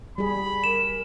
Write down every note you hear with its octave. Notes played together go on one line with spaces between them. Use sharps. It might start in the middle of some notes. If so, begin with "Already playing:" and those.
G3 G#4 B5
A#4 E7